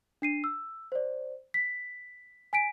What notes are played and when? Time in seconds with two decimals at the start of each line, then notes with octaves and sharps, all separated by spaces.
0.22 D4 C7 D#7
0.44 E6
0.92 C5 D5
1.54 B6
2.53 G#5 B6 D7